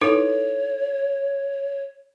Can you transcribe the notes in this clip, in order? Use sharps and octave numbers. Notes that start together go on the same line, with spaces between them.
D#4 E4 A4 B4 C#5